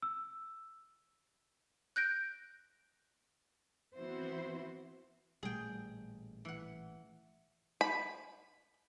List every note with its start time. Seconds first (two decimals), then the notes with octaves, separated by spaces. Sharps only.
0.02 E6
1.96 F#6 G6 A#6 D7
3.95 E3 B3 C4 E4 F#4 C5
5.43 A1 A#2 G3 A3 G#4 G5
6.45 E3 F#5
7.81 B5